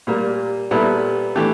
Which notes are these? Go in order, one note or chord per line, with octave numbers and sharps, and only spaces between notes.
A#2 G3 A#3
A#2 G3 B3 E4 A4
E3 A3 D4 G4